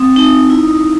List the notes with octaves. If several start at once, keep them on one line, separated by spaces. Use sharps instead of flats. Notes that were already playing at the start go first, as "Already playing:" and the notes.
Already playing: C4 D#6
D#4
E4